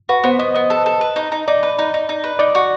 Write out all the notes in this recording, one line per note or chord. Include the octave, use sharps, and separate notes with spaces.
F#4 B4
B3 C5
B3 D#5
B3 D#5
A4
A4
B4
D#4
D#4
D#4 D5
B4
D#4
D#4
D#4
B4
D#4 D5
F#4